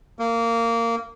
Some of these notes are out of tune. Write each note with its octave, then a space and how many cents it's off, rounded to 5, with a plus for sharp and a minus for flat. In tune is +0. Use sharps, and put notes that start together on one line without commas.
A#3 -15